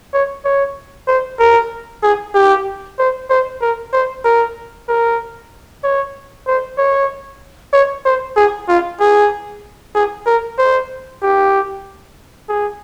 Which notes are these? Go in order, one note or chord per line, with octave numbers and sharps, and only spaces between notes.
C#5
C#5
C5
A#4
G#4
G4
C5
C5
A#4
C5
A#4
A#4
C#5
C5
C#5
C#5
C5
G#4
F4
G#4
G#4
A#4
C5
G4
G#4